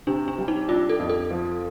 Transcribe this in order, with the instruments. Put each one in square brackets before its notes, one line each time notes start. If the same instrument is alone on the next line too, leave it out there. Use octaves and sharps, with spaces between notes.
[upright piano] C3 [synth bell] D4
[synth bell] D4
[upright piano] G3
[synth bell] D#4
[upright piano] D4 [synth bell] F4
[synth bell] A4
[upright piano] F2
[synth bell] A4
[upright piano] F3